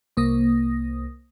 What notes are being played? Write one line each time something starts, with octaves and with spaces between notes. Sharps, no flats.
C2 A#3 D#6 A#6